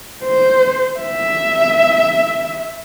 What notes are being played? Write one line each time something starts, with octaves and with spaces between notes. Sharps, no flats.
C5
E5